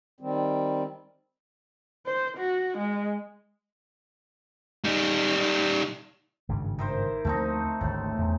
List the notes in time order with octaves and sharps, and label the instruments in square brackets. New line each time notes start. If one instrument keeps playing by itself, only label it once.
[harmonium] D#3 G3 C4
[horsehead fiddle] C5
F#4
G#3
[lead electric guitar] G3 D#4
[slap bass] G#1 G2 C#3
[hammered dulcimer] D#3 E4 C5
[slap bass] D2 F3 A#3 [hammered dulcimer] A3 C4 D#4
[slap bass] G#1 D2 [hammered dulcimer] A2
[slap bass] E2 A#2 D3